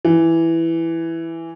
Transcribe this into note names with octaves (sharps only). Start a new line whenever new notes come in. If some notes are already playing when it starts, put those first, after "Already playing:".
E3